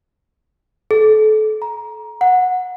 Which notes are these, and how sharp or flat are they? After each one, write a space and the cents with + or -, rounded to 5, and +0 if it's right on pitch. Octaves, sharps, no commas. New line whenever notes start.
A4 -30
A#5 +20
F#5 -15